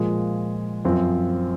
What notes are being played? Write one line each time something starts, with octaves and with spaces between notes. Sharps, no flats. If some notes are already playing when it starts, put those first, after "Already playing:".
Already playing: A#2 F3 G#3
F#2 F3 C4